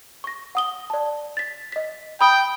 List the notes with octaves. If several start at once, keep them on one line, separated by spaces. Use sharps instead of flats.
C#6 A#6
F#5 D#6 G7
D5 A5
A6 B6
D#5 B6
G5 B5 D#6 G6